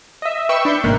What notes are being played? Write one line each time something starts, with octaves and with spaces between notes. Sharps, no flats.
D#5 E5
B4 E5 G5 B5 C#6 E6
D4 B5 G6 C#7
A1 G#2 C3 A#3 A#4 F#6